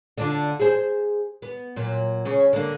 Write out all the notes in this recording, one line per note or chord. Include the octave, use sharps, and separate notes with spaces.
D3 D4 F4
G#4 C5
B3
A#2 F#3
C#3 C#4
D3 A#3